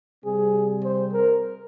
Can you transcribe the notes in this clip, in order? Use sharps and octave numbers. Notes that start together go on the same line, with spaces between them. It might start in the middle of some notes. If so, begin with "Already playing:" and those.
C3 G3 C4 G#4
C5
A#4